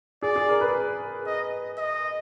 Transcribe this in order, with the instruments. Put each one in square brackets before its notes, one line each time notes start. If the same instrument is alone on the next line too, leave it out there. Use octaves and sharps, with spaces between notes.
[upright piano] G#4 [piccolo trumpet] D5
[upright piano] G#4
A#4
B4
[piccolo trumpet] D#5
D#5